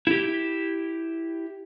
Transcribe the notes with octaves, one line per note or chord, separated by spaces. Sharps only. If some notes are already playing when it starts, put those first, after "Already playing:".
E4 G4